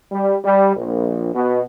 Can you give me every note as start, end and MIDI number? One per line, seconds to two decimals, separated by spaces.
0.10 0.36 55
0.43 0.74 55
0.76 1.32 34
1.33 1.60 47